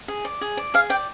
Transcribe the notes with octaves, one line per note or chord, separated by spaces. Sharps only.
G#4
D5
G#4
D5
G#4 F5
D5 G5